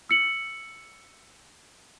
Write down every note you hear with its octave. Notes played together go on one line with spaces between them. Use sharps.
E6 C#7 F#7